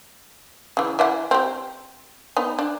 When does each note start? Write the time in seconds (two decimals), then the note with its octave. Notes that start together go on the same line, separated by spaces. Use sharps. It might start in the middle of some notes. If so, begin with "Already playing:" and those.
0.77 C#3 E3
0.99 E3 E5 F#5
1.31 C4 G4
2.37 B3 D#4
2.59 D4